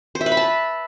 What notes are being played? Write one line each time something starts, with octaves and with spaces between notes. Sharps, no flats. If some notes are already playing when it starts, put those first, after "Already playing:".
C5
E5
B4
B5
A5